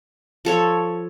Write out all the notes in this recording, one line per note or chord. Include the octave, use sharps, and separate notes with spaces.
F3 A4 C#5